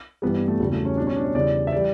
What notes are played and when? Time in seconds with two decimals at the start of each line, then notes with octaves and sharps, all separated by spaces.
0.22 G2 E3 G3 B3
0.35 B3
0.48 A3
0.60 E2 C#3 F#3 G3
0.72 A3
0.85 C#4
0.97 B2 G3 D4
1.07 C#4
1.16 D4
1.25 C#5
1.35 E2 C#3 E3 G3 D5
1.67 E5
1.72 E3 G3 D5